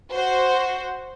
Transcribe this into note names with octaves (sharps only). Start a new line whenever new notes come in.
F#4 C5